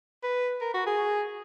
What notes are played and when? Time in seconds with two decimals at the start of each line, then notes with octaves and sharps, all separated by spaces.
0.23 B4
0.61 A#4
0.74 F#4
0.87 G#4